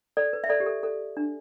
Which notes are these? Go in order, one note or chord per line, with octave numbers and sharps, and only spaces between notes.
A4 D5
B4
E5
A4 D5
G4
A4
A4
D4